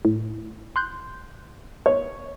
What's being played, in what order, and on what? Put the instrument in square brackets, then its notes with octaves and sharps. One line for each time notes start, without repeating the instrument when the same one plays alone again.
[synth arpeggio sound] A2
C6 F#6 G6
[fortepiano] C#5